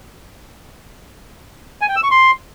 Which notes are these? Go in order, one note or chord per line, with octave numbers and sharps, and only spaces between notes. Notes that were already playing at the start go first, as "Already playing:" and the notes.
G#5
G5
E6
C#6
C6